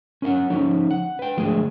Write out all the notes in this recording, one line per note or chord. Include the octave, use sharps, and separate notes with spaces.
C#4 A#4 F5 F#5
F3 C#4 D#4
F#5
B4 G5
D3 F3 G#3 A3 G#4